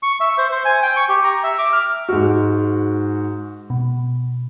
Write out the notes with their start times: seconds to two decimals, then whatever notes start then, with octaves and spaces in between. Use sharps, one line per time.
0.03 C#6
0.20 E5
0.38 C5
0.51 C5
0.65 G#5
0.83 G5
0.96 C#6
1.09 G4
1.24 A#5
1.44 E5
1.59 D6
1.73 F6
2.09 G#2 F#4
3.70 B2